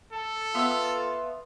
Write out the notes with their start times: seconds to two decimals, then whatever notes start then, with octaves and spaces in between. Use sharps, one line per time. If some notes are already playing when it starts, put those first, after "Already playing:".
0.13 A4
0.55 B3 F4 E5 E6